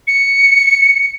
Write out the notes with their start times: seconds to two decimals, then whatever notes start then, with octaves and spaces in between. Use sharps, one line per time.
0.07 C#7